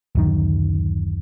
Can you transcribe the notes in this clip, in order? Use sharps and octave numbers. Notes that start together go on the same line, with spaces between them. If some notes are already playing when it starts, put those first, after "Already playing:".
D1 F#2 D#3